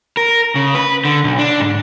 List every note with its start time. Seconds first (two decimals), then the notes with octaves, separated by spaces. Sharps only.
0.17 A#4
0.56 C#3
0.75 B4
1.05 D3
1.24 B1
1.39 D4
1.60 G#2